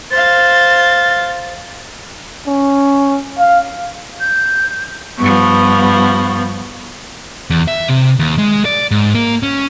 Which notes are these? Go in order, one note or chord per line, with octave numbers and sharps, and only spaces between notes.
C5 F5 A6
C#4
F5
G6
G2 F3 B3 C#6
E2
E5
C3
D#2
G#3
D5
G#2
A#3
C#4